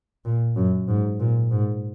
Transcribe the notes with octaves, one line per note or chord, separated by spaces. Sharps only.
A#2
F#2
G#2
A#2
G#2